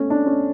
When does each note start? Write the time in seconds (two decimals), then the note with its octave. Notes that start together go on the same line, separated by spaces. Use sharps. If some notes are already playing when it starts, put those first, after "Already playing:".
Already playing: A3 C#4
0.10 D4
0.26 C#4